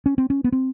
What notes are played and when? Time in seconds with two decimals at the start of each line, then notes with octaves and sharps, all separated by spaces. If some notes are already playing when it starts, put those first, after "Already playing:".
0.06 C#4
0.18 C4
0.30 C#4
0.44 B3
0.52 C4